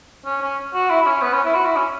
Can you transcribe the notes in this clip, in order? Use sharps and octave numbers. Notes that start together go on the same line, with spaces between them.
C#4
C#4
F#4
E4
E4
C#4
B3
C#4
E4
F#4
E4
C#4